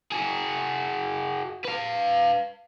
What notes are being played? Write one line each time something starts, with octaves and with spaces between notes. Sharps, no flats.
F#4 G#4
B4 F5